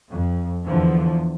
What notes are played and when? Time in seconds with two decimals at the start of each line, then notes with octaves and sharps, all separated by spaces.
0.10 F2
0.67 E2 D3 E3 F3